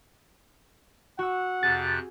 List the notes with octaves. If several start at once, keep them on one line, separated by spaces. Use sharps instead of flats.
F#4 F#5 E6
F2 C3 G#4 F#6 A6